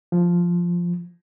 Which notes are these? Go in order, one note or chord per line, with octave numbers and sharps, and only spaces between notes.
F3